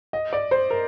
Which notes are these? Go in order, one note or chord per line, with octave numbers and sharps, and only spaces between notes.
D#5
D5
C5
A#4